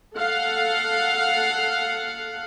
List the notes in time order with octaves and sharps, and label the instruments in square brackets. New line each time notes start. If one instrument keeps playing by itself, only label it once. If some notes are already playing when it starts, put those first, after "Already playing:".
[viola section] A4 F5 F#5